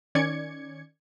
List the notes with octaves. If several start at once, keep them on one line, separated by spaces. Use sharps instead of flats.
D#3 C#4 D5 G#6 C#7